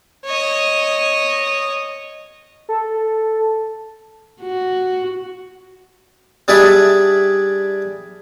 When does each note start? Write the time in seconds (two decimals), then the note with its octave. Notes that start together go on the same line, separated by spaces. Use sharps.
0.25 C#5 D#5
2.69 A4
4.43 F#4
6.48 G3 D4 G#4 D5 E5